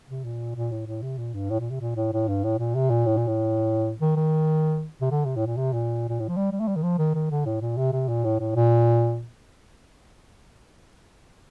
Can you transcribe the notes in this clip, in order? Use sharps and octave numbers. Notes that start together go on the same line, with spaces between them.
C3
A#2
A#2
A2
A2
C3
A#2
G2
A2
A#2
C3
A#2
A2
A2
G2
A2
A#2
C3
A#2
A2
A#2
A2
D#3
D#3
C3
D3
C3
A2
A#2
C3
A#2
A#2
A2
F3
G3
G3
A3
G3
D#3
F3
D#3
D#3
D3
A2
A#2
C3
C3
A#2
A2
A2
A#2